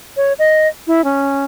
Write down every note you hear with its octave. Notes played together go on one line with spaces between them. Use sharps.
C#5
D#5
E4
C#4